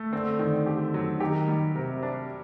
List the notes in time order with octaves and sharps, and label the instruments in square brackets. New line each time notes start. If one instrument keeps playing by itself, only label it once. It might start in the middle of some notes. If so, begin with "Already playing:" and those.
Already playing: [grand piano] A3
[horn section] D3 [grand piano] C4
[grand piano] D#3
G4
F#3
[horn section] D#3 [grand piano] G4
[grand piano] G3
[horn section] C3 [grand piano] A#4
[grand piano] D4